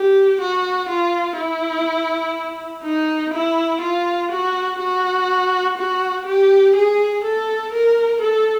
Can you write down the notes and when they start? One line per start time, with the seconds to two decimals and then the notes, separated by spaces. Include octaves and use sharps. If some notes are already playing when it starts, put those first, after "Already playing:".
Already playing: G4
0.40 F#4
0.89 F4
1.37 E4
2.83 D#4
3.33 E4
3.81 F4
4.31 F#4
4.79 F#4
5.77 F#4
6.26 G4
6.75 G#4
7.24 A4
7.72 A#4
8.21 A4